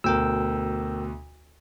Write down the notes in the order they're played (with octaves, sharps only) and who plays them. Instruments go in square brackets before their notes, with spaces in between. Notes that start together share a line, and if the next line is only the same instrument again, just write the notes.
[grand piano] D2 B2 [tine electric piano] A#4 G5 E6